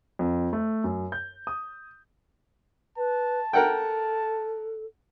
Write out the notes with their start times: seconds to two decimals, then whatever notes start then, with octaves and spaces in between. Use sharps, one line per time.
0.19 F2
0.53 A3
0.84 F#2
1.12 G6
1.47 D#6
2.97 B4 A5
3.53 A4 A#4 F#5 G5